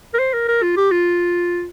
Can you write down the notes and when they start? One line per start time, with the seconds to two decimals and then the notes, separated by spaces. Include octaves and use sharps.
0.14 A#4
0.19 C5
0.34 A#4
0.48 A#4
0.63 F4
0.77 G4
0.92 F4